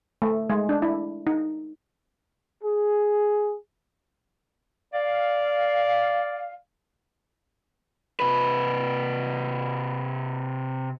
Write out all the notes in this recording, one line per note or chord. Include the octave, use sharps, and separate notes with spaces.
A3
G#3
D4
E4
D#4
G#4
D5 F5
C3 B4